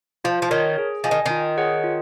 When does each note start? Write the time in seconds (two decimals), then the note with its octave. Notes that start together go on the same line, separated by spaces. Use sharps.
0.24 F3 F4
0.42 F3
0.51 D#3 A#4 C#5
0.78 G#4
1.04 F3 D#5 G#5
1.11 D#3
1.26 D#3 F4
1.58 G#4 C#5 F#5
1.84 F4